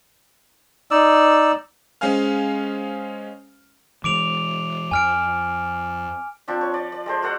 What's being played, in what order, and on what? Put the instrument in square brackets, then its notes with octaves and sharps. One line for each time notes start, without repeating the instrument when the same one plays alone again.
[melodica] D#4 D5 E6
[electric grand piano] G#3 C#4 C5 F5 G#5 F6
[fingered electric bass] E3 G#3 [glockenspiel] D6 D7 F7
[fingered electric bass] F2 [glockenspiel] G#5 F6 D7
[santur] F3 C4 D4
C#5
D5
D5
G#3 A4 C5
F#4 A4 D5 F#5